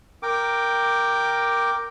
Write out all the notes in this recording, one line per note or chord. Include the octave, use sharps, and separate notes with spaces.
A#4 G5 D6